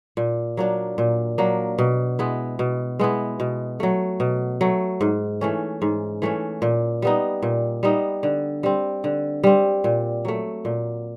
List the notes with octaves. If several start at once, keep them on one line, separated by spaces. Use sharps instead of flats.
A#2
F#3 A#3 D4
A#2
F#3 A#3 D4
B2
G#3 B3 E4
B2
G#3 B3 E4
B2
F#3 A3
B2
F#3 A3
G#2
E3 A3 C#4
G#2
E3 A3 C#4
A#2
G3 B3 D#4
A#2
G3 B3 D#4
D3
G3 C4
D3
G3 C4
A#2
F#3 A3
A#2